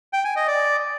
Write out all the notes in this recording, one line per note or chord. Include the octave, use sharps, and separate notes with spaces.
G5
G#5
D#5
D5